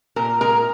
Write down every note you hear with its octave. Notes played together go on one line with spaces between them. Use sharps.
A#2 A#4
G#3 A#4